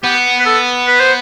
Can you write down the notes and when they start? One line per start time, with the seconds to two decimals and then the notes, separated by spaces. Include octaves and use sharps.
0.03 B3 G4
0.39 B4
0.46 A4
0.87 B4
1.00 C5